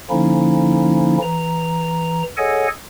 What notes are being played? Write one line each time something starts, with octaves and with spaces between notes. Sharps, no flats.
D3 F3 A#3 C#4 D#4 E4
E3 A#5
G#4 A4 C#5 D#5 F#5 G#5